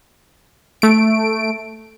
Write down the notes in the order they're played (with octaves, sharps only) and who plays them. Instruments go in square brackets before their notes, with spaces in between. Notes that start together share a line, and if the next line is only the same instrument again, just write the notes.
[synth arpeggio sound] A3 D7